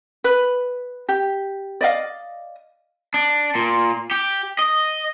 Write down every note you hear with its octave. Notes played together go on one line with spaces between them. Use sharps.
B4
G4
D5 D#5 F5
D4
A#2
G4
D#5